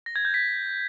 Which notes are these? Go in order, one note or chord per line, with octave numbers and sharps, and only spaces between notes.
A#6
G#6
G6
B6